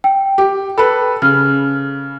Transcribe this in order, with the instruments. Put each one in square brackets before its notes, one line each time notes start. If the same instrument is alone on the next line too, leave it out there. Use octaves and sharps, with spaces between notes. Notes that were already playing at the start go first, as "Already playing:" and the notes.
[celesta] G5
[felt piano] G4
[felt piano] A4 B4 [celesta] B5
[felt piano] C#3 [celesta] F6